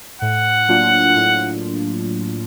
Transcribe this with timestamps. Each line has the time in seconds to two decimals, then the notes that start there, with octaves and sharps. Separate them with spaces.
0.22 A2 F#5
0.68 F#3 A#3 D4 F4
1.16 A2